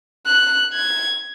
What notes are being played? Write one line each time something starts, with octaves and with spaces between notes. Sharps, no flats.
F#6
G#6